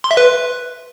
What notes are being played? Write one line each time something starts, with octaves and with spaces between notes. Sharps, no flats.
C6
E5
B4